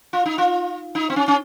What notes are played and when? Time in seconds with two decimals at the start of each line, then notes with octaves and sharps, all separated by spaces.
0.13 F4
0.25 D#4
0.38 F4
0.95 D#4
1.10 C4
1.16 C#4
1.28 C#4